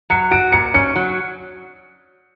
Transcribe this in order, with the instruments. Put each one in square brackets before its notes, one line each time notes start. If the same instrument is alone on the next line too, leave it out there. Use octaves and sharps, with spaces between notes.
[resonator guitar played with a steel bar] F#3 [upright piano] C#7
[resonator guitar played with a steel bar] F#4 [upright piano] D7
[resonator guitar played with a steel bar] A#2 [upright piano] C#7
[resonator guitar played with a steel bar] C#4 [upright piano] C#7
[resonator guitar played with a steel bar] F#3